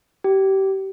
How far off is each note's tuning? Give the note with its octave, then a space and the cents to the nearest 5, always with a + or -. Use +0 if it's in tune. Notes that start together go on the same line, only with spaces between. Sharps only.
G4 -25